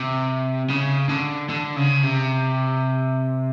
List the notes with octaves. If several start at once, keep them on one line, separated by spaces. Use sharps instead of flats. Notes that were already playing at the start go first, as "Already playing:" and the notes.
Already playing: C3
C#3
D3
D3
C#3
C3